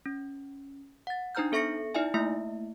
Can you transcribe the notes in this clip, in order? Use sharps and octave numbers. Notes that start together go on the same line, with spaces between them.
C#4
F#5 A6
D4 D#4 C5 A#5 F6 G6
B3 A4 E5 C#6 A#6 C#7
D#4 E4 D5 E5 G#5
A3 A#3 E4 E5